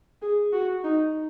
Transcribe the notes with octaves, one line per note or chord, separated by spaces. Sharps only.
G#4
F#4
D#4